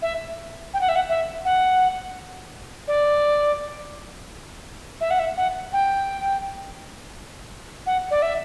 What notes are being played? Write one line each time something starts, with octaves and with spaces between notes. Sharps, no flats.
E5
G5
F#5
E5
F#5
E5
F#5
D5
E5
F#5
E5
F#5
G5
F#5
D5
E5